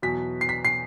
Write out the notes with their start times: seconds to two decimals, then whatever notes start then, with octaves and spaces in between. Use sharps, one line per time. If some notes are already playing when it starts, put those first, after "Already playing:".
0.02 E2 B2 F#3 B6
0.41 C7
0.49 B6
0.65 C7